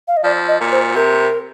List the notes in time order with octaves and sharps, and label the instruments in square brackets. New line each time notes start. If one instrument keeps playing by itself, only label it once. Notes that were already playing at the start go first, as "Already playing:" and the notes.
[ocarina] F5
D#5
[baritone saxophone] F3 [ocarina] D5
[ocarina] D#5
[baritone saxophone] A#2
[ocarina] C5
[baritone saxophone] C3 [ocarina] A#4